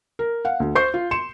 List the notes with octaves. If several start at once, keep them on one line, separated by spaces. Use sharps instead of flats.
A#4
F5 F#5
D2
C5 C#6 G6 C7
F4
C6 C#7 E7